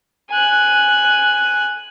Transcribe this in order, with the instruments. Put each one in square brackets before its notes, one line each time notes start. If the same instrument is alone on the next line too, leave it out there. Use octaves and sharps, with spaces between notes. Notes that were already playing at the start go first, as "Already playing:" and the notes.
[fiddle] G#5 F#6